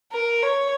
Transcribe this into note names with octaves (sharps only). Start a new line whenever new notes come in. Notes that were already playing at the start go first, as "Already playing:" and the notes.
A#4
C#5